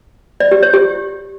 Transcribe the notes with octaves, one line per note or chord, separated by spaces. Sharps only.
D5
G4
C#5
G4